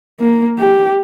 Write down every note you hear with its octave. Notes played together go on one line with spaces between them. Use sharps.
A#3
G4